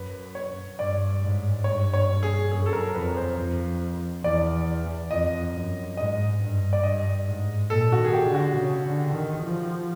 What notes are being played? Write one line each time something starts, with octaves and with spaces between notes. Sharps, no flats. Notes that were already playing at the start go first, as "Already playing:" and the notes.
Already playing: F#2 B4
C#5
G2 D5
G#2
G2 C#5
C#5
G#4
F#2 G#4
A4
A#4
F2 B4
C5
F2
E2 D5
F2 D#5
F#2
G#2 D#5
G2
D5
G2 D#5
G#2
A#2 A4
F#4
D#3
G#4
G4
D3
F#4
C#3
D3
D#3
F3